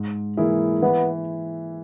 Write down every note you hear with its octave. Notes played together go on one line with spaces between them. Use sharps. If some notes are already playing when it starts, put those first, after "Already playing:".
Already playing: G#2
E3 A#3 E4 G#4
E3 B3